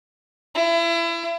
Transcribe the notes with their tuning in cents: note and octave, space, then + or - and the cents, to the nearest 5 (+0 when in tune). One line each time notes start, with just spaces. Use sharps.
E4 +30